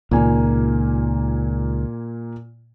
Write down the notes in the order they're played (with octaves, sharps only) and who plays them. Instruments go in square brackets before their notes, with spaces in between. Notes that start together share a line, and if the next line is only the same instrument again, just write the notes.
[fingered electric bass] C#2 D#3 [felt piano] A#2 A#3 G#5